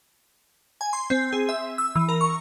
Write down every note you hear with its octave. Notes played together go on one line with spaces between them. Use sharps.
G#5
C6
C4
G#4
E5
E6
E3
A#4
C#6